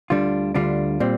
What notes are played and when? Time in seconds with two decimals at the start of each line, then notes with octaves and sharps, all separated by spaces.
0.10 D2 D3 G3 D4 F4
0.54 D2 D3 G3 D4 F4
1.00 A#2 G3 C4